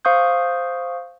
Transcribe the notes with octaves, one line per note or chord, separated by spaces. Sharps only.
C5 F5 C#6 D#6 G6